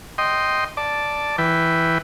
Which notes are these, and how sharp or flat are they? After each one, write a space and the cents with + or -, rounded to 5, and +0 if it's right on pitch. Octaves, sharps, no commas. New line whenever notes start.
D#5 +0 G5 -10 C6 +0
D5 +0 A5 +0
E3 +0 B4 +0 G5 +0